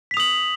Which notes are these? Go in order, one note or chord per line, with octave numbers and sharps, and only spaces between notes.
D#6 B6 F7 F#7